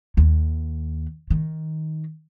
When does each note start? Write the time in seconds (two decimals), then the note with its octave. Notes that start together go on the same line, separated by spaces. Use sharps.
0.17 D#2
1.30 D#3